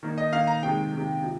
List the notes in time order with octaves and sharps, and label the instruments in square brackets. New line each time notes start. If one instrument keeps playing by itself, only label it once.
[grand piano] D#3 A#3 D#4
D#5
D#3 A#3 D#4 F5
A#5
C3 D#3 G#3 G5
C3 D#3 G#3
C3 F3